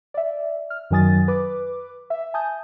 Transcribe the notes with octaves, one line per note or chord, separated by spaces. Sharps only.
D5 E5
F6
F#2 D#3 F#3 G#5 D#6 A6
B4 D6
E5
G#5 A5 D#6 G6